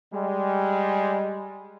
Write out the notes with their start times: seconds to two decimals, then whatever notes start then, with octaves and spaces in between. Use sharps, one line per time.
0.13 G3 G#3